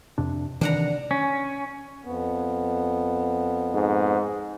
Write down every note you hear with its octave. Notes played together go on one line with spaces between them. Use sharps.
F2 C3 D4
C3 D#3 E3 D4 F#5 A#5
C#4
F2 B3
G#2